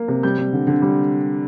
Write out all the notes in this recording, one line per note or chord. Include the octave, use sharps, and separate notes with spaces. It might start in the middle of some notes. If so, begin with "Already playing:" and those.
Already playing: A#3
C3
G3 G6
G3
D3
D3
G3